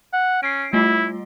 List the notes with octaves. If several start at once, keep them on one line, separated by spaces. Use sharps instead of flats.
F#5
C#4 C7 D7
G3 A3 E4 F4